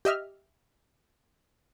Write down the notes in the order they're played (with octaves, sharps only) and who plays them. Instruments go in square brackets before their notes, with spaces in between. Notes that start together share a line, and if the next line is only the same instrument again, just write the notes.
[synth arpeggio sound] G4 D#5 E5 F6